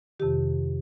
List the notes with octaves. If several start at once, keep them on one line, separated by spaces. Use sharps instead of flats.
F2 C3 D#3 G4